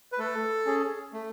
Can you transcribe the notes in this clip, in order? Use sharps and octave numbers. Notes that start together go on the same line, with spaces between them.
B4
A3 A4
C#4 G#4
A3